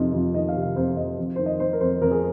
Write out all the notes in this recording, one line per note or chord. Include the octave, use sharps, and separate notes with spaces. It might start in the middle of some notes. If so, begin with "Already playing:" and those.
Already playing: F2 C3 D#3 D#4 F4
F2 F4
D#3 D#5
F5
C3
F5
F2 C5
F2 D#5
F2
D#3 C5
D#5
D#3 C5
A#4
F2 C5
F2 A#4
G#4